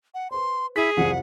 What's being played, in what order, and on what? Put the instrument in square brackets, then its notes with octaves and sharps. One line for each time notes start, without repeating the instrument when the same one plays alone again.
[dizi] F#5
[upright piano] B4 C5 [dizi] C6
[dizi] E4 [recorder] G#4 [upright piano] B6 F#7
[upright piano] C2 F2 F3 [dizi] F#5